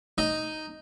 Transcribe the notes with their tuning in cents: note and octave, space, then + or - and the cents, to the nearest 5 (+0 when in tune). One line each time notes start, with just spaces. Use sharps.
D#4 +0 D#5 +0